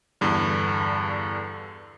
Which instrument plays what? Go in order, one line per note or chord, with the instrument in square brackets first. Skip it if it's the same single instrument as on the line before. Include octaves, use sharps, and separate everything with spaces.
[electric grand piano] E2 G2 D3